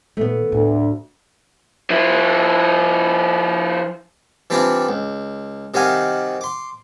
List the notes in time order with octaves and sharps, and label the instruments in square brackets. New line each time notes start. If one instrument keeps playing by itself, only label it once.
[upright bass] A#2 D#3 [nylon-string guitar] A3 B3
[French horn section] D2 [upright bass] A2
[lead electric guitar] F3 E4
[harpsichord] E3 G3 C4 D4 E4 F4
C#2
C3 D#3 G3 F#4 F5 G#5
C6 D6